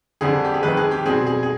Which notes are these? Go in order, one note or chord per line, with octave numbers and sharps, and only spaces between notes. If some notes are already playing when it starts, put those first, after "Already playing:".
F2 D3 G3 G#4
G4
G#4
F2 D#3 G#3 B4
G#4
G4
B2 G3 C4 G#4
G#4
G#4